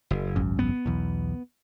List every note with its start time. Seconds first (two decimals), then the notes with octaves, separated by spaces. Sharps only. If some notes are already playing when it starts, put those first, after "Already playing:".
0.11 F#1
0.36 G#1 C#2 F#2
0.59 B3
0.86 B1 E2